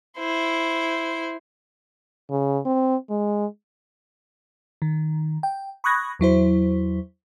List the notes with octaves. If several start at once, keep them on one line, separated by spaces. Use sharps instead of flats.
E4 C5
C#3
C4
G#3
D#3
G5
B5 C#6 D#6 F#6 G#6 A#6
E2 F#3 E4 C5